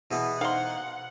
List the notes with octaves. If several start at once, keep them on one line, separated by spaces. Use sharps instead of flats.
B2 E3 B3 E4 G#4 F#5
D#4 C5 F5 F#5 A#5 C6